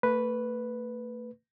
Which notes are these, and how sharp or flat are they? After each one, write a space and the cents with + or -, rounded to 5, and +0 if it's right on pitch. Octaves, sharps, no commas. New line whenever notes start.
A3 +40 B4 +0